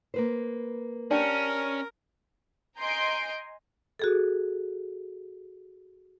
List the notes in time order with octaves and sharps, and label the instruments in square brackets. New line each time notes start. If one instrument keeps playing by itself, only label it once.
[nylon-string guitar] A#3 B4 C5
[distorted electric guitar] C#4 [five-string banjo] D4 G4 [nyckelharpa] A#4
[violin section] D#5 G#5 A#5 C6 G6 D7
[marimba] F#4 G#4 A4